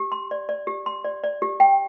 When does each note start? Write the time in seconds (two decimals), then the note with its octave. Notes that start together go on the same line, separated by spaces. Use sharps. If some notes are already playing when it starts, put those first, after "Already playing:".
Already playing: G4
0.12 C6
0.31 D5
0.49 D5
0.67 G4
0.86 C6
1.04 D5
1.24 D5
1.42 G4
1.60 G5